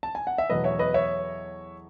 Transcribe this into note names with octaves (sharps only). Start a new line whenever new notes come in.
A5
G#5
F#5
E5
E2 B2 F#3 A3 B4 D#5
C#5 E5
B4 D#5
C#5 E5